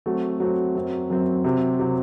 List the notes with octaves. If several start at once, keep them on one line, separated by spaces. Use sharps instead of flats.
F#3 A3 C4 F#4
F#3 A3 C4 F#4
F#2 F#3 C4
F#2 F#3 C4
C3 F#3 C4 G4
C3 F#3 C4 G4